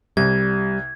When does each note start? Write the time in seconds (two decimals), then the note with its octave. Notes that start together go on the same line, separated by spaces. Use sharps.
0.17 C2 G3 G#6